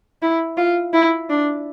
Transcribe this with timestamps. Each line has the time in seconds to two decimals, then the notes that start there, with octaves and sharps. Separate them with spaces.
0.22 E4
0.57 F4
0.93 E4
1.30 D4